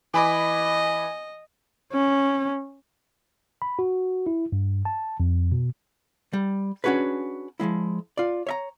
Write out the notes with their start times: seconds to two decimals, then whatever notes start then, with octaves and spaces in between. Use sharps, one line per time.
0.14 E3 D#5 G#5 B5 D6
1.93 C#4
3.62 B5
3.79 F#4
4.27 E4
4.52 G2
4.85 A5
5.20 F2
5.52 B2
6.33 G3
6.84 C#4 D4 F#4 G#4 B4
7.60 F3 F#3 G#3 E4
8.17 F4 D5
8.47 C#5 E5 A#5